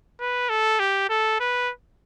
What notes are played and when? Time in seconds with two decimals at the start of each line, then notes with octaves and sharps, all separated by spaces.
0.20 B4
0.49 A4
0.79 G4
1.09 A4
1.40 B4